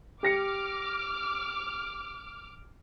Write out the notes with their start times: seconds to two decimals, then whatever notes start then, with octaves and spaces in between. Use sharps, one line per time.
0.23 G4 D6 F6 A#6 C#7